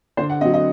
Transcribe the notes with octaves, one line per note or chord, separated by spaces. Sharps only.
D3 C5
F#5
F#3 C4 D#5
D#5